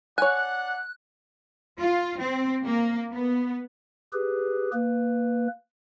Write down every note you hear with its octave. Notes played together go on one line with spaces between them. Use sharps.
D4 C#5 F#5 G#5 F#6
F4
C4
A#3
B3
G4 G#4 B4
A#3 B4